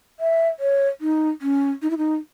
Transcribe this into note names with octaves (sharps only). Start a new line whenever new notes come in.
E5
C#5
D#4
C#4
D#4
E4
D#4